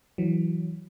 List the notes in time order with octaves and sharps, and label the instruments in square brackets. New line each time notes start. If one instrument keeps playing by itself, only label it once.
[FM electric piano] E3 F#3